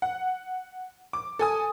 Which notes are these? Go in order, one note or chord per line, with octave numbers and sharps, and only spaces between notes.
F#5
D6
A4 G#5 D#6